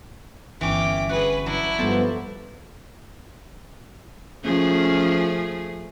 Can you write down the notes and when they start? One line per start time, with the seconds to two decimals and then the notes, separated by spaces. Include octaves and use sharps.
0.61 G1 E3 C#4 G5 D6
1.09 F#4 G#4 B4 F#5
1.46 F#3 D4 E4
1.78 G2 F3 B3 A4 C5 A5
4.44 F3 A3 C#4 G#4